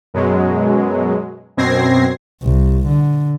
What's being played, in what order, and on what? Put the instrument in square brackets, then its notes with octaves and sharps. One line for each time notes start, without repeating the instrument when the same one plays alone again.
[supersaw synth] F#2 B2 F#3 G#3
F#2 B2 C4 G#6 A#6 C7
[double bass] C2
D3